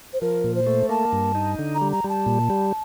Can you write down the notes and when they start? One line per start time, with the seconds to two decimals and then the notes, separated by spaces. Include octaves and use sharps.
0.13 C5
0.21 F3 A#4
0.44 A#2
0.56 C5
0.67 A3
0.89 A#3 A5
1.13 G2
1.35 D#4
1.59 D3
1.75 A#5
1.82 G3
1.92 A#5
2.04 G3 A5
2.26 A#2
2.50 G3